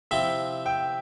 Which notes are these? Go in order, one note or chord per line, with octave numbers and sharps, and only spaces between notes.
C3 F3 C4 E4 E5
G5